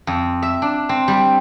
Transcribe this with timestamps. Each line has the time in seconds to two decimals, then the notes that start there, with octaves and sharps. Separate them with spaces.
0.07 F2
0.42 E5
0.62 D4
0.89 C4
1.08 G3